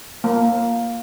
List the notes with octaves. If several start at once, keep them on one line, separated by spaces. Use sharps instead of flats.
A#3